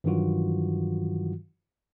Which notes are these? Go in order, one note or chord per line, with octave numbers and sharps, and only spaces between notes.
G2 D#3 E3 F#3 F4 F#4